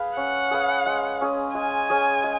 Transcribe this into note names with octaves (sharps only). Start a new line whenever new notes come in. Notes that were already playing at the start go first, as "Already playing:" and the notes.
Already playing: G#4 B4 F5
C#4 F#5
G#4 B4 F5
G#3
C#4 G#4 D#5
G#3 G#5
C#4 G#4 D#5
G#3